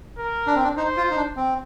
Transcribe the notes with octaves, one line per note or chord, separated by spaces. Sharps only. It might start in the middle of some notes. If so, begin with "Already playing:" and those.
A#4
D4
C4
D4
D#4 C5
F4
D#4
D4
C4